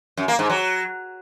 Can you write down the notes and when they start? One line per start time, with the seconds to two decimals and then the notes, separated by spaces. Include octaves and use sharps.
0.17 F#2
0.28 A#3
0.39 G#2
0.50 F#3